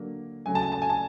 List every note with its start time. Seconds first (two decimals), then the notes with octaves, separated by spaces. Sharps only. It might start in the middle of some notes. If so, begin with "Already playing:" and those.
Already playing: D3 F#3 A#3
0.46 C#3 F#3 A3 G#5
0.55 A5
0.63 G#5
0.72 A5
0.82 G#5
0.90 A5